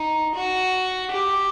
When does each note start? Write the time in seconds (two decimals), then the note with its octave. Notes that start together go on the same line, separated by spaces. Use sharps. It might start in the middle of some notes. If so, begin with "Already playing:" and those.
Already playing: D#4
0.35 F#4
1.11 G4